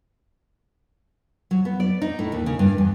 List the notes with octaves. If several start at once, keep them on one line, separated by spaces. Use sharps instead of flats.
F#3
B3
D5
D#4
A2
D#2
C#3
G2
E2